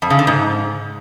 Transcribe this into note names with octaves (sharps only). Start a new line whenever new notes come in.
F2
C#3
D3
G#2